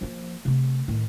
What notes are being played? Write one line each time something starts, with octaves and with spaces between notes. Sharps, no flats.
F3 A#3
C3 A3
A2 D#3